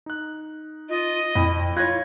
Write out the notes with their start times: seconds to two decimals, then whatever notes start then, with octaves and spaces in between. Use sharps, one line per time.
0.06 D#4 F#6
0.89 F4 D#5
1.35 F2 E4 B5
1.76 F4 C#5 F#6 G#6 A#6